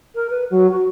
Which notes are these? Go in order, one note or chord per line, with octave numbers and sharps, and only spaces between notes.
A#4
B4
F#3
F#4